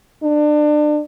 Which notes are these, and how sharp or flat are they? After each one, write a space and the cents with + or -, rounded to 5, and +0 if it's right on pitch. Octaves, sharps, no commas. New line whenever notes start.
D4 +30